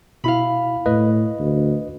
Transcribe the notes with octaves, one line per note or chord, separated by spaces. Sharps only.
B2 E4 F5 B5
A2 B4 D#5
D2